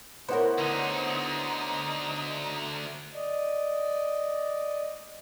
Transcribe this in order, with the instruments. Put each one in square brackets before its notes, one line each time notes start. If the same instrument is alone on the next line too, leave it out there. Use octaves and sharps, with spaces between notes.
[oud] B3 E4 A#4 [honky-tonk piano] C5 C#5 F#5
[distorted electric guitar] D2 D3 [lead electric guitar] D#4
[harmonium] D5 D#5